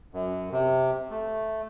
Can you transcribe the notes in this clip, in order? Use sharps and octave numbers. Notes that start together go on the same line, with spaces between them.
F#2
C3
A3